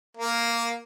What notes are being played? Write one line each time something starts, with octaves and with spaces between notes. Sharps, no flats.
A#3